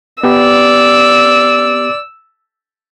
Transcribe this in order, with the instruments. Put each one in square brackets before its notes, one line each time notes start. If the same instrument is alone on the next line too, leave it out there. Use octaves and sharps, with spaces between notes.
[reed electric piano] B3 G4 [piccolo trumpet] D5 [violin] E6